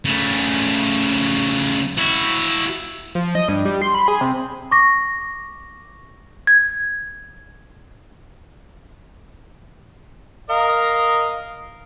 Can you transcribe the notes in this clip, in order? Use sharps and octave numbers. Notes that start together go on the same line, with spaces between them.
C#3 A3
E4 F#4
F3
D#5
G2
G3
C6
B5
G#4
C3
C#6 D6 A#6
G#6
A#4 D#5 F5